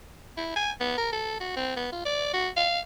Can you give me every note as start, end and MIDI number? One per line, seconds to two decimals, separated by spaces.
0.37 0.52 64
0.56 0.71 80
0.80 0.94 59
0.98 1.11 70
1.12 1.38 69
1.40 1.55 66
1.56 1.74 60
1.76 1.88 59
1.92 2.02 65
2.05 2.32 74
2.33 2.49 66
2.56 2.80 77